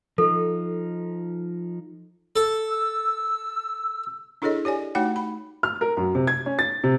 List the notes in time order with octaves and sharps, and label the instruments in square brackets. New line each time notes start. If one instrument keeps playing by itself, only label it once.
[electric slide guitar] F3 D#4 [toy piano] A4
[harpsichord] A4
[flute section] E6
[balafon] D4 E4 G#4 A4 C#5 D#5
G4 C#5 D5 G#5
A3 D#4 F#4 C#5 F#5 G5
B5
[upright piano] F6
A#4
F#2
C3
G#6
C#4
A6
C3